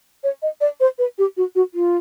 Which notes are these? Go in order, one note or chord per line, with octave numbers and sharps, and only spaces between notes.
C#5
D#5
D5
C5
B4
G4
F#4
F#4
F4